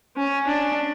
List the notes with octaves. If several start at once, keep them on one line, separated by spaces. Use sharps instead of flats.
C#4
D4